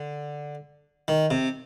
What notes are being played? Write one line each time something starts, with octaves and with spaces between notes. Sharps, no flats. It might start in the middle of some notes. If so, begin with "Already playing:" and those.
Already playing: D3
D#3
C3